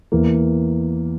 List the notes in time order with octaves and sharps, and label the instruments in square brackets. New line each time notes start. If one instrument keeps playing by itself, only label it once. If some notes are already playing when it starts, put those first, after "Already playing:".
[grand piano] E2 E3 A#3